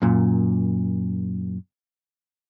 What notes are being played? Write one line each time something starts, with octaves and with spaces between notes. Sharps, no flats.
F#2 A#2